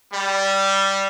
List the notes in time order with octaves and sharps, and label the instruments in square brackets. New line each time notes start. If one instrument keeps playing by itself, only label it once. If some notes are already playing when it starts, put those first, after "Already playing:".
[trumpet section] G3